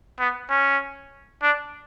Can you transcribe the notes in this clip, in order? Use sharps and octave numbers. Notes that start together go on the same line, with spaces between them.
B3
C#4
D4